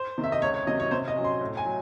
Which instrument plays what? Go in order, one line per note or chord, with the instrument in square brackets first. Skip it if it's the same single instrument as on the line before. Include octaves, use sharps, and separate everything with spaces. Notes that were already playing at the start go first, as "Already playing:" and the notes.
Already playing: [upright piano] C5
C3 D#3
E5
D#5
C#2 C#5
C#5
C3 D#3 F#3 D#5
C#5
C3 C5
D#5
F#3 C#4
C6
A2
G#5
F#3